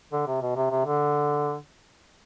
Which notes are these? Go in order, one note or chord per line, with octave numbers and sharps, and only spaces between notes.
D3
C3
B2
C3
C3
D3